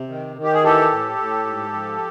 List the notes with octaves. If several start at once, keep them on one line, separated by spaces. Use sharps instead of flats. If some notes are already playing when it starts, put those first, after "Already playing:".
Already playing: C3
D#3
D#3
G4
G#4
E3 G4 A4
A2
A2
G#2
F3